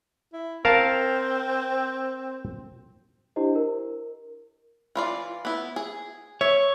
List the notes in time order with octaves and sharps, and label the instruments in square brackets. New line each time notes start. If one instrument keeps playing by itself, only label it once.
[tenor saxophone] E4
[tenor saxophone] C4 [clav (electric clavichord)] A#4 F5 A5
[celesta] D4 E4 G4 C5 D#5
A#4
[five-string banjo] E3 F4 D5
B3 E4
G#4
[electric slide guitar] C#5 [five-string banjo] E5